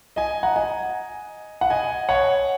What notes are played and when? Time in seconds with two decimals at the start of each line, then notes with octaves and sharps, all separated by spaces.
0.16 D#5 G#5
0.43 F#5 A#5
0.56 D#5 G#5
1.61 F#5
1.70 D#5 G#5
2.09 C#5 F#5